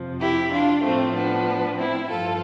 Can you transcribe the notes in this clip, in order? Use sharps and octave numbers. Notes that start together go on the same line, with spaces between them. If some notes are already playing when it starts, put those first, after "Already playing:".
Already playing: F2 C3 F3
E4 G4
D4 F4
A2 F3 A3 C4
B3 D4
C4 E4
G2 F3 F4 A4